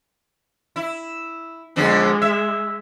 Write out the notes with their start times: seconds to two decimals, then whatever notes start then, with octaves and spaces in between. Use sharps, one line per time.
0.76 E4
1.76 F2 D3 G#3 B3
2.22 E5